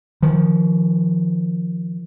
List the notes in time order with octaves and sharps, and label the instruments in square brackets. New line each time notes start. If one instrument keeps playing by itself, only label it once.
[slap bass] D#3 F3